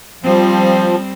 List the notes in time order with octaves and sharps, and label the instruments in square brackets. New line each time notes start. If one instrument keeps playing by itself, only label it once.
[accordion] F3 [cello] G3 C4